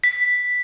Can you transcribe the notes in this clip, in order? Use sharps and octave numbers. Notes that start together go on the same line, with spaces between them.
B6